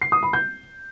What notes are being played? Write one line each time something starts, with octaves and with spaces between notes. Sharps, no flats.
C7
D#6
B5
G6